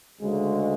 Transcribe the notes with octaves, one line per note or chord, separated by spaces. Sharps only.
D2 C#3 G#3